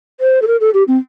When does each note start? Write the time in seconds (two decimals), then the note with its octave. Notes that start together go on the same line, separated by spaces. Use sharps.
0.20 C5
0.42 A4
0.47 A#4
0.60 A4
0.74 G4
0.88 C4